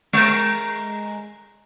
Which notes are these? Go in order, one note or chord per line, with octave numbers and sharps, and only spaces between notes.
G#3 A#4